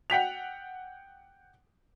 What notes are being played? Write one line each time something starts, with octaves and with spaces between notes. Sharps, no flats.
F#5 G5 B6 F7